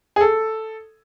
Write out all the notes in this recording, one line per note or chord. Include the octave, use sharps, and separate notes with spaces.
G#4
A4